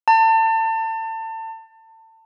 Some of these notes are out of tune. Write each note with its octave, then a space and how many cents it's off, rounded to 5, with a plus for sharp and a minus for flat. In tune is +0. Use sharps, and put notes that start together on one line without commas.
A5 +30